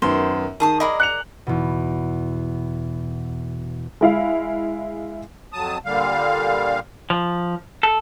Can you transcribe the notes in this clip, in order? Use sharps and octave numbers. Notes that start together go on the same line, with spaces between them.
F#2 D#3 B3 C5
D#3 G#4 A5 D#6
G#4 A#4 D5 D#5 B5
F#6 C#7 F7
E2 B2
G#3 E4 F5
F2 F#3 A5 D#6
A#2 D3 G3 F5
F3
A4